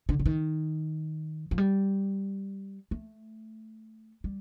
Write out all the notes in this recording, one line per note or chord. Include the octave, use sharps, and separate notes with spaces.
D3
D3
D#3
F3
G3
A3
G3